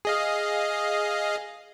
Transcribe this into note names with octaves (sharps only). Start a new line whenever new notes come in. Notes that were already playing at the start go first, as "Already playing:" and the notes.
G#4 D#5 F5